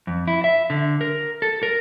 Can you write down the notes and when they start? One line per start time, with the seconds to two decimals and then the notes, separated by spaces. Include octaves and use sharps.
0.07 F2
0.28 E4
0.44 E5
0.70 D3
1.01 A#4
1.42 A4
1.63 A#4